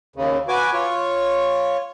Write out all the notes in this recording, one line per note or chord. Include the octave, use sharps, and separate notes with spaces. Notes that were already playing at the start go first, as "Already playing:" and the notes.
D#2 C#3
F#4 B4 G#5 D6
F4 C#5